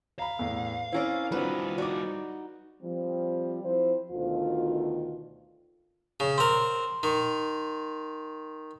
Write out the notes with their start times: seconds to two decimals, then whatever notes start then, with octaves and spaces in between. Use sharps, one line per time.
0.19 F5 A#5 B5
0.39 E2 A2
0.92 C4 C#4 E4 A#4 D5
1.32 G3 C4 D4 F4 F#4 B4
1.78 D#4 F#4 D5 D6
2.82 F3 G3 C4
3.64 F3 C4 E4 C5
4.11 D2 B2 D3 D#3 F4
6.20 C#3
6.38 C4 A#4 C6
7.03 D#3